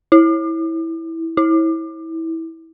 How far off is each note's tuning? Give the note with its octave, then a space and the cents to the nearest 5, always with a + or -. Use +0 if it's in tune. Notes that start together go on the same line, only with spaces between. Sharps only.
E4 -10
E4 -20